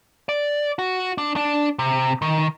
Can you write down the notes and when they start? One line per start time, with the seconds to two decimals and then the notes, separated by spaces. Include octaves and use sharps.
0.29 D5
0.79 F#4
1.18 D4
1.36 D4
1.79 C3
2.22 D#3